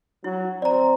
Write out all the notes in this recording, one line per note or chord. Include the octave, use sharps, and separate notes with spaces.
F#3 E4
C4 D5 A#5